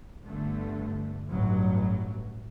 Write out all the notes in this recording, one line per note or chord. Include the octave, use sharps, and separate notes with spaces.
G1 G2 D3 A3
A1 G2 F#3